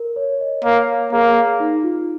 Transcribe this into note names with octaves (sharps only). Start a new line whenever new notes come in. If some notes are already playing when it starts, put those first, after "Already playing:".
Already playing: A#4
C#5
D#5
A#3 C#5
A#4
A#3 G#4
D#4
F4